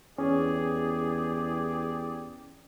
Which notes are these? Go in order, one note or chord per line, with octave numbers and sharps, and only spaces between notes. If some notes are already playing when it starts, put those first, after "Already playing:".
E2 C#4 G4 G#4 D5